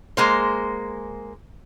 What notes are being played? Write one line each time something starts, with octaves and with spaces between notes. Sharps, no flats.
G#3 A#3 C5